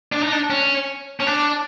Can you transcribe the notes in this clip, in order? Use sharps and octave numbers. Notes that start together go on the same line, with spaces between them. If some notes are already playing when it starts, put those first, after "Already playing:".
D4
D#4
D4
C#4
C#4
D4